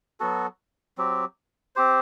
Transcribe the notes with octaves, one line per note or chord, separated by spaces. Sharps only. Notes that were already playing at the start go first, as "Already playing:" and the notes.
F#3 B3 F#4 A4
F#3 C4 G4
C4 G4 C5